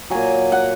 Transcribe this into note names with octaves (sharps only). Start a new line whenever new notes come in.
A#2 F#3 G#5
F#5